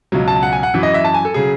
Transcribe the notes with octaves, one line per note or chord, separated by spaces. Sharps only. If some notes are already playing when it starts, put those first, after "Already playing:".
C#2 B2 F#3
A5
F#5
G#5
F#5
F#2 E3
D#5
E5
A5
G#5
A4
C#3 F#3 G#4